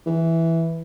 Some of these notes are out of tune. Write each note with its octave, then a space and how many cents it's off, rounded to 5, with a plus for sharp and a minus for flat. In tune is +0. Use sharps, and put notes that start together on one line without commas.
E3 +0